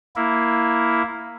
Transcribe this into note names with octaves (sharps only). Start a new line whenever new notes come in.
A#3 E4